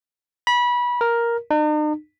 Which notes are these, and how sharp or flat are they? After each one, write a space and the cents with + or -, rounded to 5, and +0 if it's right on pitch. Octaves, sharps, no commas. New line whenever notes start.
B5 -25
A#4 +5
D#4 -45